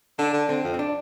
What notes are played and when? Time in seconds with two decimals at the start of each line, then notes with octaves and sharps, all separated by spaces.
0.18 D3 D4
0.33 D3
0.49 D3 C4
0.64 F2
0.74 C4
0.79 D4